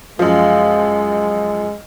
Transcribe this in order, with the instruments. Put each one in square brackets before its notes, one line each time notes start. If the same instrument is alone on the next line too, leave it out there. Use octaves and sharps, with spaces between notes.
[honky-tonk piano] F#2 F3 [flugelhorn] G#3 [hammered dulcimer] D#5 F5